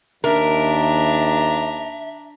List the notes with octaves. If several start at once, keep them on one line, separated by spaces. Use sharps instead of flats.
D#2 D4 A#4 E5 A#5